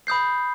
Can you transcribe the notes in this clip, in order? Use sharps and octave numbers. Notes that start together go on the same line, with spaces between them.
B5 D#6 G6 C7